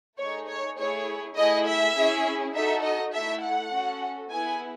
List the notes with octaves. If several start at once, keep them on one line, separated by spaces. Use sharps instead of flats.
A3 D#4 G#4 C#5
C#5
A3 E4 G#4 C#5
A3 E4 G#4 D#5
E5
C#4 E4 G#4
D#4 F#4 A4 E5
D#5
A3 E4 A4 E5
F#5
C#4 F#4 A4
B3 E4 G#4 G#5